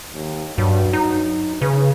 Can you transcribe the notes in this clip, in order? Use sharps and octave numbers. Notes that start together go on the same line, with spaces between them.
D#2
G2 F#3
D#4
C#3 B4